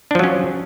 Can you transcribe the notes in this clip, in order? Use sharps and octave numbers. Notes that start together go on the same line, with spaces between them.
F3 F#3 C#4 D4